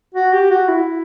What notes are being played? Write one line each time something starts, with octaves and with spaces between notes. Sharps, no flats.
F#4
G4
F#4
E4